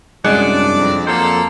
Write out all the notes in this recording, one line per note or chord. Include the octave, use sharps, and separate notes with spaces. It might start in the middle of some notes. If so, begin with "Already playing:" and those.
C2 F#2 G#3 D4 D5 F#5
F2
F2 F#3 A#3 A4 C5